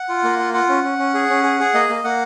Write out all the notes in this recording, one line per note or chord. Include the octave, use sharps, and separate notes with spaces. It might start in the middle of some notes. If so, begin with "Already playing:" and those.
Already playing: F#5
F4
A#3
F4
F4 F#5
C#4
C#4
C#4
G#4
C#4
G#4
G#4
A#3 D#5
A#3
A#3 F#5